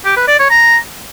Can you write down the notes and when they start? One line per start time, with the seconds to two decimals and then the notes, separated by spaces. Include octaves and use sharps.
0.05 G4
0.17 B4
0.28 D5
0.39 C#5
0.50 A#5